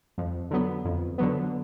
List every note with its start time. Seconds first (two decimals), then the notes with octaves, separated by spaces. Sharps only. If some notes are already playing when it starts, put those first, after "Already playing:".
0.18 F2
0.51 D3 F#3 B3
0.85 F2
1.18 D3 F#3 B3